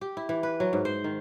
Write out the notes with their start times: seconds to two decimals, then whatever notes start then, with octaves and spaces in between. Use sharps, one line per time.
0.01 G4
0.17 E4
0.29 E3
0.43 B4
0.60 F#3
0.73 G#2
0.85 C5
1.04 D#3